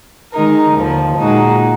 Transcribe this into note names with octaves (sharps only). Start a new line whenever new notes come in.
D#3 G#3 D#4 A#4
D#2 D3 F3
A#2 G#3 D#4 F#4